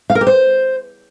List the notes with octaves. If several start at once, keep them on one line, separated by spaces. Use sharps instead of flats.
F5
A#4
G4
C5